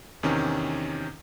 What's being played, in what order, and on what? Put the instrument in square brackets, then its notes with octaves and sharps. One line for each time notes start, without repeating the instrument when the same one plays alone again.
[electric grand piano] E2 C3 D#3 C#4